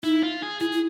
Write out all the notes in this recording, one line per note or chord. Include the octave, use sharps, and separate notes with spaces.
D#4 E4
F4
G#4
E4 G#4
E4